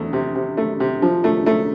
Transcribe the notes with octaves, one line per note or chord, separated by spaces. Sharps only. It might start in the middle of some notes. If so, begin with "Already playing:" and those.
Already playing: E2 A3
C3
C3
A3
C3
F3
A3
A3